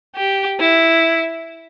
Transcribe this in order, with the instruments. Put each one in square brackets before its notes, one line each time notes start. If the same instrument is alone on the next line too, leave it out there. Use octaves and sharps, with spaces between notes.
[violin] G4
E4